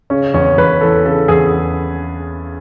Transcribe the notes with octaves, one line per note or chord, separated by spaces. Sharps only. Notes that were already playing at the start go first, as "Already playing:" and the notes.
C#3 C#4
E2 C#4
E2 B4
E3 A4
C#3 A4
E2 G#4